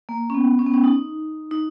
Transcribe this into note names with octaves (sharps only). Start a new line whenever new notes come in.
A#3
C#4
B3
C#4
B3
C#4
D#4
D#4